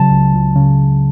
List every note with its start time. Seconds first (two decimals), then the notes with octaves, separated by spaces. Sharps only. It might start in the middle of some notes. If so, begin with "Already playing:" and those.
Already playing: C#3 F#3 A5
0.11 C#2
0.33 C#2
0.56 C#3